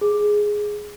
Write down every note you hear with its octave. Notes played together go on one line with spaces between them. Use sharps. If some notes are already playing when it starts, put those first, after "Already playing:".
G#4